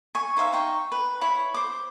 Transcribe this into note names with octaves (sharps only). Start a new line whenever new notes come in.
G#5 C#6
D#4 C5 E5 F5
D#4 G5 C#6
B4
E4 C#5 B5
C5 D6